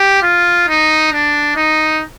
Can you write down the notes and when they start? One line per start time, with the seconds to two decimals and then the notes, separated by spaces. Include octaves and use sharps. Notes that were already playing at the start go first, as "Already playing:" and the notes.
Already playing: G4
0.22 F4
0.68 D#4
1.13 D4
1.56 D#4